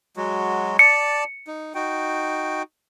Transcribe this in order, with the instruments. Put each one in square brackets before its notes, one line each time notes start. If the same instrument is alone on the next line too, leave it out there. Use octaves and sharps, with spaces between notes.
[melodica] F#3 G#3 F#4
[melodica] D5 A5 [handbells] C#7
[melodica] D#4
D#4 F#4 G5